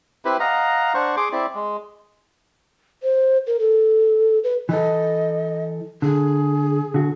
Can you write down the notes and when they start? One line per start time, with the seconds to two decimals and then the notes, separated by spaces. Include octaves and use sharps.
0.25 C4 E4 G4 B4
0.40 D#5 F5 F#5 A#5
0.94 D4 C5 F#5 C#6
1.17 G#4 C6 D6
1.32 C4 E4 D5
1.55 G#3
3.03 C5
3.47 A#4
3.60 A4
4.44 B4
4.69 E3 A4 D#5
6.02 D3 G#4
6.94 D3 F#4